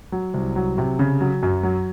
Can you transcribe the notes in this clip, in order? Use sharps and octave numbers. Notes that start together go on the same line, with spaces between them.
F#3
C2
F#3
C3
C#3
F#3
F#2
F#3